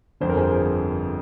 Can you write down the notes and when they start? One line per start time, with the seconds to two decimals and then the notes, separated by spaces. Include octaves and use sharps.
0.20 G1 F2 D3 C5
0.29 A#4
0.37 G#4 C5